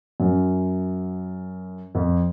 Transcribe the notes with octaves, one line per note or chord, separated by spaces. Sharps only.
F#2
F2